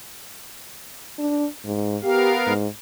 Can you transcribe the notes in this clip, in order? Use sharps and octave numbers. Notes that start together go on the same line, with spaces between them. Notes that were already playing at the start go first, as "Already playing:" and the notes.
D4
G#2
B3 G4 A#4 F5
G#2